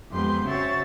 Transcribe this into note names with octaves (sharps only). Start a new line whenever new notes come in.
F2 G#3 B3 G4 C6 G6
C#3 C4 F#4 C#5 E5 A6